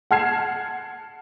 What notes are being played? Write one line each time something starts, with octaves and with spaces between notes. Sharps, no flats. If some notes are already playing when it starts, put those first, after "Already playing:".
F#5 A5 F6 G#6 C7 E7